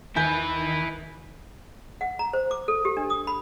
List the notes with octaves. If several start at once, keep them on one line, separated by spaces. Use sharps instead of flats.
D#2 D#3 E4 B4 G#5 G6
F#5
A#5
C5
D6
A4
G4
D4
D#6
B5